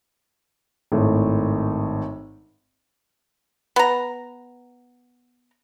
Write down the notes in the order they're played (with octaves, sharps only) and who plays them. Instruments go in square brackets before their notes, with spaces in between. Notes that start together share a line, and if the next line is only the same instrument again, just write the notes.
[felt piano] G#1 A2
[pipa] B3 A#5